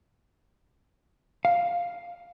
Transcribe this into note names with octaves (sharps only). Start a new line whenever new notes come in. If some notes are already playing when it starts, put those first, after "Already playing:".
F5